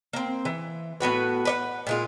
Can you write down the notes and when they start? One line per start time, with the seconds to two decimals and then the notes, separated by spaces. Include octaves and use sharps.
0.13 A#3 C4
0.45 E3
1.00 A2 B3 F#4 B4
1.45 B4 D5 F#5
1.87 A#2 G#3 F4